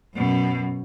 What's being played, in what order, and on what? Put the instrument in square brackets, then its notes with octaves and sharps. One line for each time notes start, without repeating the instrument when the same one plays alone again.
[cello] F#2 B2